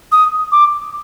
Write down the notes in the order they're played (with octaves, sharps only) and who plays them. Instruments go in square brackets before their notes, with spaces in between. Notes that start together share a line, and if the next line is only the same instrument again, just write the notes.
[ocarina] D#6
D6